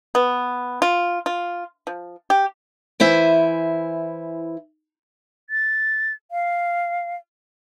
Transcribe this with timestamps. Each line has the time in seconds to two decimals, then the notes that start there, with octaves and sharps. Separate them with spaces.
0.15 B3
0.82 F4
1.26 F4
1.87 F3
2.30 G4
3.00 E3 E4 C5 E5 G#5
5.50 A6
6.31 F5